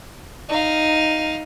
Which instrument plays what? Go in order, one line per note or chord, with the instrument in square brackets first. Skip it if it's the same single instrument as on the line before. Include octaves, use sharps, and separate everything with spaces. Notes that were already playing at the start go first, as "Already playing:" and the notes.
[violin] D#4 F5